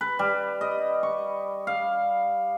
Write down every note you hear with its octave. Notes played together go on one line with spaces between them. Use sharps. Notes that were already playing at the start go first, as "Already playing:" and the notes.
B4
G3
D#5
C#6
F5